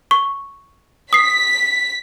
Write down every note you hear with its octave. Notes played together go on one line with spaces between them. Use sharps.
C#6
D#6 B6 C7